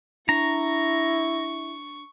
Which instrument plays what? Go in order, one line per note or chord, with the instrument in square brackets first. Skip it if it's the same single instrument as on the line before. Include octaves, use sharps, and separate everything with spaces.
[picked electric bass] D4 [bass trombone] E4 [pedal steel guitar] A#5 [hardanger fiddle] C#6